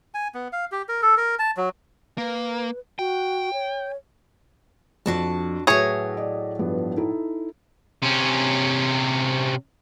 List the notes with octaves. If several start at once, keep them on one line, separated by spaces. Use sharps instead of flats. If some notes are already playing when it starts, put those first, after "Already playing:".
G#5
B3
F5
G4
A#4
A4
A#4
A5
F#3
A#3 B4
F#4 G5
C#5
F2 D4 F#4 A5
A2 F#3 F#4 G#4 B4 C#5 E5
D5 D#5
G2 F3 B3
D#4 E4 A4
C3 C#4